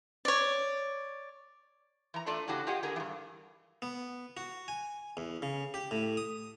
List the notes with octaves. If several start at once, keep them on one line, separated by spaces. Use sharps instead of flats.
C#5 D5
E3 A#5
A3 D4 F4 A4 D5
A2 C#3 D4 F#4 G4
F4 G4 G#4 D#5 F#5
D3 G#4 A#4
G2 E3
B3
F#4
G#5
E2
C#3
G4
A2
D#6